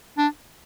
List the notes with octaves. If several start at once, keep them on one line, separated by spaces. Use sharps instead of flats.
D4